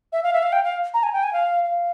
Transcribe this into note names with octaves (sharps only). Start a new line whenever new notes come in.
E5
F5
E5
F5
G5
F5
A#5
G#5
G5
G#5
F5
F5